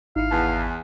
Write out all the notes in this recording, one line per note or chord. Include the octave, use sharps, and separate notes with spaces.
G#1 D#4 E4 F5
E2 F#5 G#5 A5